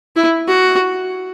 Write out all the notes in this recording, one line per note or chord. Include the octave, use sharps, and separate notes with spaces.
E4
F#4